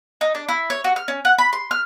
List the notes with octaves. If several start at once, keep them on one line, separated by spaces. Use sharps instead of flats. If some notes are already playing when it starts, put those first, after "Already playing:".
D#4
D4
E4
C#5
F#4
F6
C#4
F#5
B5
C6
F6